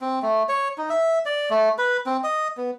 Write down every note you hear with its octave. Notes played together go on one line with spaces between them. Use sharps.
C4
A3
C#5
D#4
E5
D5
A3
B4
C4
D#5
B3